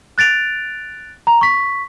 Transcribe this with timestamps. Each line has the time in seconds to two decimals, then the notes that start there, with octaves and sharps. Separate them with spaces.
0.18 F#6 A6 D7 F7
1.27 A#5
1.41 C#6 B6